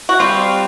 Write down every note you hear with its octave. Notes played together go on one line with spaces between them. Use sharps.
F#4
G3 C4 F4 G4